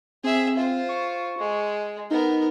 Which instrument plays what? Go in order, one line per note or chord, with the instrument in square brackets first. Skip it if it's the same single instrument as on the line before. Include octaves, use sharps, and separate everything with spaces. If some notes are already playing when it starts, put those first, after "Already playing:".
[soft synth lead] C4 [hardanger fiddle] G#4 E5
[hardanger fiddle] F4 C5
[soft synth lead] C#6
[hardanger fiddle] G#3
[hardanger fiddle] B3 A#4 [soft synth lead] D#4